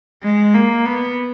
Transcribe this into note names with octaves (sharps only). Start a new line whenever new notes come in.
G#3
A#3
B3